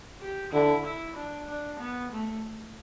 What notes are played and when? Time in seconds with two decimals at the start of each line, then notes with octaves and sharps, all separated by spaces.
0.21 G4
0.53 D3 E4
0.85 E4
1.16 D4
1.48 D4
1.80 B3
2.12 A3